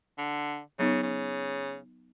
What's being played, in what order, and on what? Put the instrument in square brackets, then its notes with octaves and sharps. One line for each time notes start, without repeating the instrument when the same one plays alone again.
[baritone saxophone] D3
[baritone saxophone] C#3 [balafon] F#3 B3 D#4
[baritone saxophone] C#3